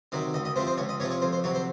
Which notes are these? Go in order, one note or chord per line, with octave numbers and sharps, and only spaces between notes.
C3 D#3 F#3
C#2 D#5
D#5
C3 F3 C5
C5
C#2 C#5
D#5
C3 F3 C#5
C#5
F2 C5
C5
C3 F#3 C#5
C5